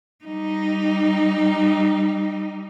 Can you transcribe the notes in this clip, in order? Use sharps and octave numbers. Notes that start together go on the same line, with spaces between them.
G3 D#4